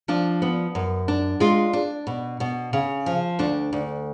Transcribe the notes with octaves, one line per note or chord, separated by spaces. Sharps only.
F3 D4
B3
F#2
D4
G#3 F4
D4
B2
B2
C#3
F3
D2 D4
D2